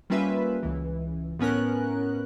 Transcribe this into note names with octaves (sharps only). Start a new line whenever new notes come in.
G3 A#3 C#4 F4 B4 E5
C#2 E3
A2 B3 C#4 A#4 F#6